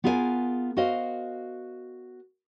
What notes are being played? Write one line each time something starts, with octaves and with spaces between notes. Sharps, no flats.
B3 F4 G#4 A#4 D5 G#5
F#4 A#4 C5 D#5 F5